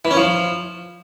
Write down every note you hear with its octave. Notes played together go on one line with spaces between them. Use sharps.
E3
C#4
F3